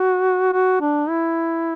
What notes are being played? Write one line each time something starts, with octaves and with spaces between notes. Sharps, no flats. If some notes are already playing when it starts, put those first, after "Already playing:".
Already playing: F#4
F#4
D4
E4